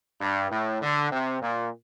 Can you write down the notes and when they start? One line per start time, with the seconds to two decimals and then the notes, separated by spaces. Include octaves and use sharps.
0.21 G2
0.51 A2
0.82 D3
1.12 C3
1.42 A#2